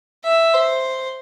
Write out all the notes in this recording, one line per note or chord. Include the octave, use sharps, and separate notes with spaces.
E5
C5